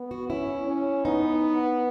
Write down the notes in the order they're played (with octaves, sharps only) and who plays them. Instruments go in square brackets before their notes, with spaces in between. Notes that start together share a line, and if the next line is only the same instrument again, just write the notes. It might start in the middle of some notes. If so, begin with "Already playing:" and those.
Already playing: [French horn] B3
[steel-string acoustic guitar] F#4
[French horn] C#4 [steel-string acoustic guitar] E4
[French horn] C#4
[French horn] B3 [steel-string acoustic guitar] D#4